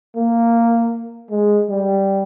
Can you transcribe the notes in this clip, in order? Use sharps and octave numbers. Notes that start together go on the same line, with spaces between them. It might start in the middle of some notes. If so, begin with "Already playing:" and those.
A#3
G#3
G3